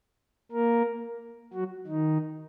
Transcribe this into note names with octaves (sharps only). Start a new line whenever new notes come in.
A#3 A#4
F#3 F#4
D#3 D#4